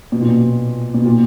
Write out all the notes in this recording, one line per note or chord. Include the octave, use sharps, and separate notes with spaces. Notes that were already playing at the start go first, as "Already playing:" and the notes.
B2
A#2
B2
B2
A#2